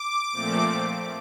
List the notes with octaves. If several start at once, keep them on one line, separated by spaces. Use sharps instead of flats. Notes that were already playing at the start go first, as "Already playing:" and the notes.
Already playing: D6
A#2 F3 A3 C4